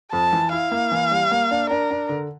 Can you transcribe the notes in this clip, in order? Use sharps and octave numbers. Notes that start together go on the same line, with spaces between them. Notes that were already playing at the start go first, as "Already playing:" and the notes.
F2 A5
E3
E4 F5
A#3
E3
G3
A#3
D4
D4 A#4
D4
D3